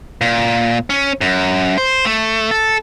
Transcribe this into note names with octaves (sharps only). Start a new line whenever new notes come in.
A#2
C#4
F#2
C5
A3
A4